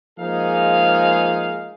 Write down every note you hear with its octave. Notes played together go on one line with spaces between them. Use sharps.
F3 G#3 A#3 D#4 G#4 F5